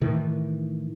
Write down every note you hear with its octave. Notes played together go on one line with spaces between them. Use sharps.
A2 D#3 E3